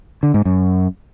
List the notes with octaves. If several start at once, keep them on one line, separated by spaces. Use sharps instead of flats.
D3
G#2
F#2